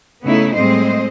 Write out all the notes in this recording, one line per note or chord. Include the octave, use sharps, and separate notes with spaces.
C#3 A3 B3 D#4 E4 A4
A2 G3 G#3 C4 C5 D#5